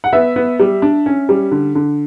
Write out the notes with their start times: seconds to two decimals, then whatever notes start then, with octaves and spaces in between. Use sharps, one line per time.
0.04 F#5
0.13 B3 E5
0.36 B3
0.59 G3
0.82 D4
1.06 C#4
1.29 G3
1.52 D3
1.75 D3